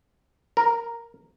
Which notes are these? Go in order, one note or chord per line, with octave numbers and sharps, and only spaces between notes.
A#4